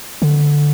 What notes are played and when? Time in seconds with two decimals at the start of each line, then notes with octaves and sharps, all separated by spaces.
0.22 D3